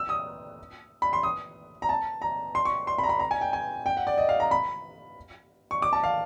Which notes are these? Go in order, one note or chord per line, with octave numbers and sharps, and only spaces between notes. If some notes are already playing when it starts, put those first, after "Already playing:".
Already playing: E6
D#6
B5
C6
D#6
A#5
A5
A#5
C6
C#6
C6
B5
A#5
B5
A#5
G#5
G5
G#5
G5
F#5
D5
D#5
F5
A#5
B5
C#6
D6
A5
F5